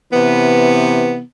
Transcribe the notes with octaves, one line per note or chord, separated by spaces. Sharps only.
C3 E3 B3